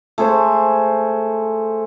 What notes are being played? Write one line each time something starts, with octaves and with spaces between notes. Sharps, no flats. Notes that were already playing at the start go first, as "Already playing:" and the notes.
A3 G#4 C5